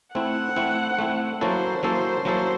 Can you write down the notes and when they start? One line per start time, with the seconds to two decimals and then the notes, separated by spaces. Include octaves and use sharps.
0.14 A3 C4 E4 F#5
0.56 A3 C4 E4
0.99 A3 C4 E4
1.41 F#3 A#3 C#4 E4 A4 C5
1.83 F#3 A#3 C#4 E4 A4 C5
2.25 F#3 A#3 C#4 E4 A4 C5